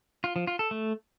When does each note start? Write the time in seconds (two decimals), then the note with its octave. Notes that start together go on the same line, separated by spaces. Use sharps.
0.24 F4
0.36 F3
0.47 F4
0.59 A4
0.71 A3